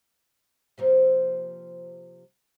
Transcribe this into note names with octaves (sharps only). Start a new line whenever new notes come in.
C3 F3 A#3